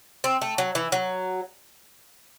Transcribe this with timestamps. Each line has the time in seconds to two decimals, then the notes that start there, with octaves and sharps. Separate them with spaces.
0.24 C4
0.42 A3
0.58 F#3
0.75 E3
0.92 F#3